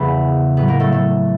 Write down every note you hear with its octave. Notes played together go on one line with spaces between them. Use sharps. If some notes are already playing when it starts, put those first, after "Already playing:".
Already playing: E2 C#3 F3 B3
A2 F#3 B3
A#3
A3
A3